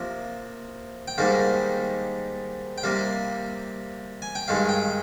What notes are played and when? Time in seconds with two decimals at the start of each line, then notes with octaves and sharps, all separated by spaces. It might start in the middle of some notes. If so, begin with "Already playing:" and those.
Already playing: C3 F3 A#3
1.08 G5
1.18 G#2 D#3 G3 A#3 F5
2.78 G5
2.83 C3 G3 A#3 F5
4.22 G#5
4.35 G5
4.48 G2 D#3 G#3 F5
4.69 G5